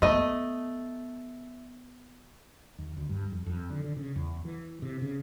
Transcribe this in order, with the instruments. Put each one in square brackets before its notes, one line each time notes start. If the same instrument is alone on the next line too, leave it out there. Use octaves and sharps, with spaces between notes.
[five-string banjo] A3 D#5 [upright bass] B3
[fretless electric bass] D#2
D2
G2
F2
F2
D3
D3
C#3
E2
E3
C3
C#3